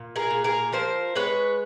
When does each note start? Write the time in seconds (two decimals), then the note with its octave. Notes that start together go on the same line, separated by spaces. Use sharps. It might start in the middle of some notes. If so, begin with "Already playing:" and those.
Already playing: A#2
0.16 G#4 A#4
0.31 A#2
0.44 G#4 A#4
0.72 F3 A#4 C5
1.15 G#3 B4 C#5